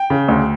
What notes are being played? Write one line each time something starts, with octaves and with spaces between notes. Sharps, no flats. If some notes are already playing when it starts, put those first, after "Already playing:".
Already playing: G5
C#3
D2